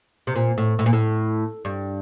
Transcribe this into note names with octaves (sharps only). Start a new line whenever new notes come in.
C3
A#2
A2
A2
A#2
A2
G2